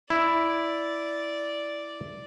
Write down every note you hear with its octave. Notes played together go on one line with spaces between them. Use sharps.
E4 D5